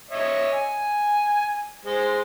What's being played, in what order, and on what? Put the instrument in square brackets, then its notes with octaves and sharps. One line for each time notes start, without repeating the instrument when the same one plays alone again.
[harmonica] C#5 D#5 E5
G#5
G#3 C5